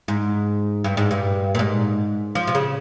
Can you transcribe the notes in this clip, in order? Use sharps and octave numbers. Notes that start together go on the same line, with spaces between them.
G#2
G2
G#2
G2
A#2
G#2
F3
C3
C#3